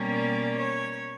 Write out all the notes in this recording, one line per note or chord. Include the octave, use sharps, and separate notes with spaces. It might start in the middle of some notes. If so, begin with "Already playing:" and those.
Already playing: B2 G3 A#3 C#4
D5
C#5